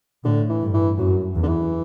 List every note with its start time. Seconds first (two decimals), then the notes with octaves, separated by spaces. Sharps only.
0.24 A2 D3
0.49 E3
0.61 G2
0.73 E3
0.98 F#2 F#3
1.36 E2
1.43 D3
1.48 E3